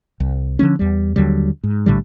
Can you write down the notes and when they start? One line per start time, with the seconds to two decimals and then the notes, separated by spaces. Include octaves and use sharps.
0.20 C2
0.59 D3 F3 B3 C#4
0.79 E2 G3
1.16 D#2 D3 F#3 G3
1.64 G#2
1.86 A#1 A2 D3 G3